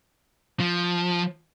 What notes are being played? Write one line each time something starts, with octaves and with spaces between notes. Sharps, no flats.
F3